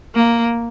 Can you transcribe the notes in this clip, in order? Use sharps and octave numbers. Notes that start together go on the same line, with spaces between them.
A#3